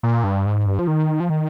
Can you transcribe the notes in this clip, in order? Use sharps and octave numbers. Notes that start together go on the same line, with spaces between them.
A#2
G2
G#2
G2
F3
D#3
F3
D#3